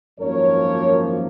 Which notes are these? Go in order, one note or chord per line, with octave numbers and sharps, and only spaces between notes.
G#1 F#2 F3 A#3 A#4 C#5